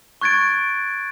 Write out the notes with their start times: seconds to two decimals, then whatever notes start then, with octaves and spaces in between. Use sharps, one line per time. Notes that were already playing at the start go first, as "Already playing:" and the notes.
0.21 C#6 F#6 G#6 A6 D7